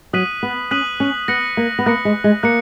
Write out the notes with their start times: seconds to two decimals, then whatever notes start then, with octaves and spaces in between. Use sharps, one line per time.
0.13 F#3 D#6 F#6 B6 D#7 F#7
0.43 B3
0.71 C#4 D#6 F#6 B6 D#7 F#7
1.00 C#4
1.28 B3 F#6 A#6 C#7 F#7
1.57 A#3
1.79 B3
1.86 A#3 F#6 A#6 C#7 F#7
2.05 G#3
2.24 G#3
2.43 A#3 F#6 C#7